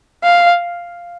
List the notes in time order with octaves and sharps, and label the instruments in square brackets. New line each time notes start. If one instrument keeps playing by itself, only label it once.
[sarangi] F5